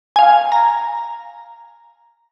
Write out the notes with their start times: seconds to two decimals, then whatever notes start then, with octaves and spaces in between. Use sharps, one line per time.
0.16 F5 G#5
0.52 A#5